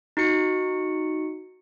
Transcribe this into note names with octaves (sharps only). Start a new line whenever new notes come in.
D#4 F#4 C#7